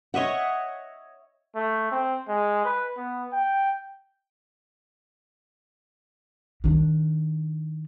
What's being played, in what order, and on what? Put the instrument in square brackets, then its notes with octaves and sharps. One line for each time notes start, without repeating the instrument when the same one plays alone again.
[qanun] C#5 D#5 E5 F#5
[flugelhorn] A3
C4
G#3
B4
B3
G5
[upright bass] D#3 D4